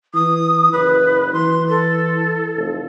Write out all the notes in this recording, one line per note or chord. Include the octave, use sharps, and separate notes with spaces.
E3 D#6
F#1 B4
E3 C6
A4
F1